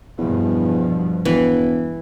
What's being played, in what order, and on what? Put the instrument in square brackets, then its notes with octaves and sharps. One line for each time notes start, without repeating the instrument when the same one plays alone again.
[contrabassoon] E2 [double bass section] G2 B2 F3
[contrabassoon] E1 [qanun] E3